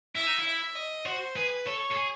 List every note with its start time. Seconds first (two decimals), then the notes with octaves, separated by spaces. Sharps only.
0.15 E4 E5
0.26 D#4
0.38 E4
0.46 E5
0.75 D#5
1.05 F#4 C5
1.36 G#4 B4
1.66 A4 C#5
1.91 A4
1.96 G#4